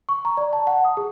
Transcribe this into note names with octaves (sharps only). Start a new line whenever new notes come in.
C#6
A#5
D5
A5
F#5
D#6
G#4